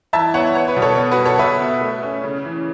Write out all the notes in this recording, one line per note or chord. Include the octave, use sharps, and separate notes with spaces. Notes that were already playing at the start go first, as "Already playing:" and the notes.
E3 E5 A5
B3 C#5 F#5
B3 C#5
B4
B2
A4 C#5
B3
F#4 B4
B2
A4 C#5
B2 B4 E5
B3
A3
C#4
C#3
E3